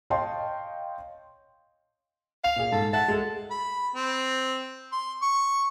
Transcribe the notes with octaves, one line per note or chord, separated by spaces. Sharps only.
C#5 D#5 F5 G5 A5 C6
F5 F7
A#2 G#4
G#2 A4
E5 F#5 A5
G#3 A4
B5
C4
C6
C#6